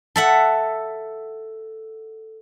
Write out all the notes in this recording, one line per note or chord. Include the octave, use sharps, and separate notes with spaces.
A4 E5 F#5